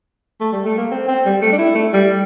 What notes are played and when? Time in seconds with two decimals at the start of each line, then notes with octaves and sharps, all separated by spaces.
0.40 A3
0.52 G3
0.65 A3
0.78 A#3
0.91 C4
1.08 C4
1.25 G3
1.42 A3
1.53 D4
1.58 E4
1.75 A3
1.93 G3